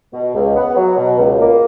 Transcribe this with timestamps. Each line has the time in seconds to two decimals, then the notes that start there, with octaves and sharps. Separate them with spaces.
0.14 B2
0.35 C#2
0.56 B3
0.76 F#3
0.97 B2
1.19 C#2
1.39 A#3